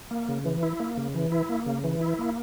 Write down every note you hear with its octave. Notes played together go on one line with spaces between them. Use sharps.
A#3
C#3
E3
E4
A#3
C#3
E3
E4
A#3
C#3
E3
E4
A#3